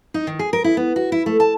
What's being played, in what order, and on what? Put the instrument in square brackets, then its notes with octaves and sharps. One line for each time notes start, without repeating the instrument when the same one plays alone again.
[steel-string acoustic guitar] D#4
D#3
G#4
A#4
E4
B3
F#4
E4
A3
A5